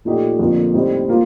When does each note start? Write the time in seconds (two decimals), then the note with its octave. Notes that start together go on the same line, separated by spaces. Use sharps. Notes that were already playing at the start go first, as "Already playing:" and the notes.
0.05 A#2 F3 A3 D#4 G4
0.39 F2 D3 F3 A#3
0.74 A2 G3 C4 D#4
1.09 A#3 F4